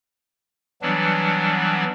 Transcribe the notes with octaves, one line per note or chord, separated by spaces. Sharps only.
E3 F#3 G3 B3 D4